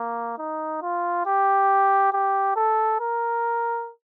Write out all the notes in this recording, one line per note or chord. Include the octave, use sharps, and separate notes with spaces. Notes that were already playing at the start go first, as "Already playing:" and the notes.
Already playing: A#3
D#4
F4
G4
G4
A4
A#4